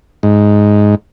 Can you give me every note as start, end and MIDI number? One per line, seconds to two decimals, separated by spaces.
0.23 0.95 44